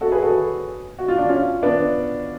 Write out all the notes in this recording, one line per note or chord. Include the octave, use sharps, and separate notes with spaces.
F#4 A4
G#4 B4
F#4 A4
F#4
F4
D4
C#4 F4
B3 D4